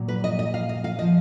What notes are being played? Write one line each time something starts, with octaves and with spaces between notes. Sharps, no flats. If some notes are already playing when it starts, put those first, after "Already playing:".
Already playing: A#2 F#3
B4
D#5
D#5
F5
D#5
F5
F3 D#5